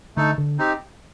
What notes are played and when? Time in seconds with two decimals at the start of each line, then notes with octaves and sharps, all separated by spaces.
0.16 D3 A3 D#4 A4
0.38 D3
0.58 C4 D#4 G4